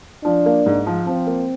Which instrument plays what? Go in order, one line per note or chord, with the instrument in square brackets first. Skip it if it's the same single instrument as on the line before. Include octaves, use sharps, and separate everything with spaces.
[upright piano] F3 [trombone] D4
[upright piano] A#3
G#2
F3
[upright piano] F3 [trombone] C4
[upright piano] A#3